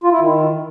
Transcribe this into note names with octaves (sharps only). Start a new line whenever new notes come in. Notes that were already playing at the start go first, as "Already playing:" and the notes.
F4
E4
D#3